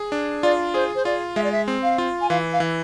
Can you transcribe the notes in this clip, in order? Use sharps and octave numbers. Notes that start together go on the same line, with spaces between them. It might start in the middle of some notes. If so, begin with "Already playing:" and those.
Already playing: G#4
D4
F4 D5
G#4 C5
C5
F4 D5
G#3 E5
D5
E5
C4
F5
F4
G#5
E3 F5
F5
E3